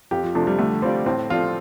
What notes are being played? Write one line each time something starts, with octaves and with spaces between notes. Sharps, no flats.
F2 G4
F3
C3 F3 A3 D4
G3
D3 A3
G3 C4 F4 D5
A2 C4
F3 C4 F4 A4 D5